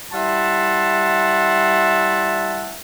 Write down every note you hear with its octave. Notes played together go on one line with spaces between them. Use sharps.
G3 E4 E5 F#5 A5 C6